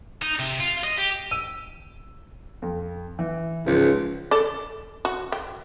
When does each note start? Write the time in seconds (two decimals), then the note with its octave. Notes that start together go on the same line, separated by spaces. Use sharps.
0.22 D#4
0.39 C3
0.60 F4
0.84 D#5
0.98 G4
1.31 E6 D#7
2.62 F2
3.19 E3
3.66 C#2 G#2 F3
4.31 A4 D5
5.05 F#4
5.32 G5